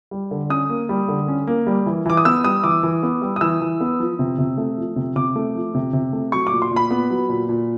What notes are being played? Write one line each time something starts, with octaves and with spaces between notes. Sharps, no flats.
G3
D3
C#4 D#6
A#3
G3
D3
C#4
A#3
G3
E3
E3 D6
D#6
B3 E6
G3 D#6
E3 D6
E3
B3
G3
D#6
E3 E6
E3
B3
F3
C3
C3
A3
F3
C3
C3 D6
A3
F3
C3
C3
A3
F#3 C#6
D6
A#2
C6
A#2
B5
B3
F#3
A#2
A#2